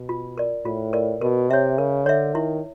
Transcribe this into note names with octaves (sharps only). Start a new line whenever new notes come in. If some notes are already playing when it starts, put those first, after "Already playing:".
Already playing: B2
F4
A#4 D5
A2 F4
A#4 D5
B2 A#4
C3 C#5 E5
C#3 A#4
D3 C#5 E5
D#3 E4